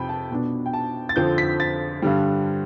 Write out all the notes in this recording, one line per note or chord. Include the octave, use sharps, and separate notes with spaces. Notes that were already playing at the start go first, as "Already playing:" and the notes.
Already playing: F2 C3 G5 B5
A5
B2 B3 D4
G5
A5
A6
F2 D3 F3 C4 G6
B6
A6
G2 D3 G3